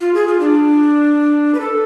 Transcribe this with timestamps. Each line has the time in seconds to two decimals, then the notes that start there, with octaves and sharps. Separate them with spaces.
0.01 F4
0.15 G#4
0.28 F4
0.40 D4
1.55 B4
1.60 A4